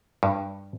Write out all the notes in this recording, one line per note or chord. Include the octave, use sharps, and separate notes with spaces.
G2